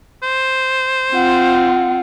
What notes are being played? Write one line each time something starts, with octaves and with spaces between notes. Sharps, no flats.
C5
C4 F4 F#5